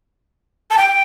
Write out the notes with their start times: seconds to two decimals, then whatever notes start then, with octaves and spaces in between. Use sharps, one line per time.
0.71 A5
0.78 G5